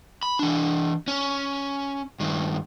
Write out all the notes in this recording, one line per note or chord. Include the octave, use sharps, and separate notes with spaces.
B5
E3 D4
C#4
G2 D#3